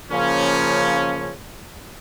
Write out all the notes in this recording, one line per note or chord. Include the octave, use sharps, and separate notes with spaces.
C#3 F3 A#3 C#4